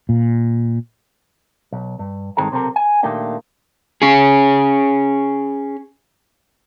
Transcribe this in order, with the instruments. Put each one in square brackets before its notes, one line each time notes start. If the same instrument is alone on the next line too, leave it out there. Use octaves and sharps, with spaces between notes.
[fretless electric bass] A#2
[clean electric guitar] B1
G2
G2 D#3 G#3 C4 A4 A#5
B1 C3 C4 A4 A#4
G#5
A#2 D#3 A3 A#3 D4 G4
[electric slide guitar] C#4 G#4